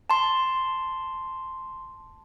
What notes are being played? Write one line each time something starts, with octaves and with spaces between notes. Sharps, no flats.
A5 C6